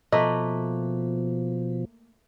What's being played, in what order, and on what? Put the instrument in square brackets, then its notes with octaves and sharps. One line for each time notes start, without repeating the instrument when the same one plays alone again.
[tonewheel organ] B2 F3 [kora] A3 A#3 B4 [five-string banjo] D#5